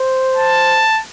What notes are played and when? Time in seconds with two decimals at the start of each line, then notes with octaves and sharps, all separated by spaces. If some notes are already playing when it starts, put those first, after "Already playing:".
Already playing: C5
0.37 A5